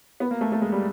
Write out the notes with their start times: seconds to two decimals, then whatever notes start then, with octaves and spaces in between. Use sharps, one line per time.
0.20 B3
0.31 A#3
0.41 A3
0.52 A3
0.62 G#3
0.72 G3